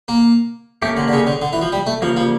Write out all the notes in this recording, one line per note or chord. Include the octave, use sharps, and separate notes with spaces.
A#3
A3 A#3 C#4 G4
D3
D3
C#3
D3
D3
E3
F3
G3
A3
C#3 F3 G3 A#3
F3